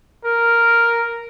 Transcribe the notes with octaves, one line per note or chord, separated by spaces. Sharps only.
A#4